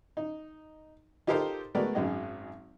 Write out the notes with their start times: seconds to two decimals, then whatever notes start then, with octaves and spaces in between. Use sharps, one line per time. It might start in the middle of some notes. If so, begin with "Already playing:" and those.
0.17 D#4
1.27 D#4 F4 G4 A4 A#4 C5
1.75 G#3 A3 B3 F#4 A#4 D5
1.95 G#1 F#2 G#3 D#4 F#4 D#5